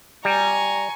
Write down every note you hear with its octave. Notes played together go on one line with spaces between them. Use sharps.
G3 G#5 A#5 C#6